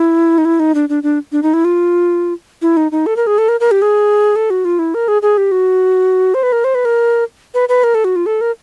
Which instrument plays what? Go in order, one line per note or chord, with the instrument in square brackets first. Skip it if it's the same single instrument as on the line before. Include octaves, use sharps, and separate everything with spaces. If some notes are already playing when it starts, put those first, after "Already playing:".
Already playing: [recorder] E4
D#4
E4
D#4
D4
D4
D4
D4
D#4
E4
F4
E4
D#4
D#4
A4
A#4
G#4
A4
A#4
A#4
G4
G#4
A4
F#4
F4
E4
A#4
G#4
G#4
G4
F#4
C5
B4
A#4
C5
B4
A#4
B4
B4
A#4
A4
F#4
F4
A4
A#4